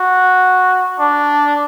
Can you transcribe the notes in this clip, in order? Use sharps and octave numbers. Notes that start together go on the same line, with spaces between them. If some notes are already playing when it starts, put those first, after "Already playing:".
Already playing: F#4
D4